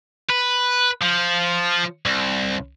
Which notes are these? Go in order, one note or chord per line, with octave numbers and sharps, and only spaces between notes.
B4
F3
C2